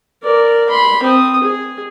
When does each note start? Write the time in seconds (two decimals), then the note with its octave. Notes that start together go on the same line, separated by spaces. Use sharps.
0.23 A#4 D5
0.69 B5 C6
1.03 C4 D#6
1.43 G#4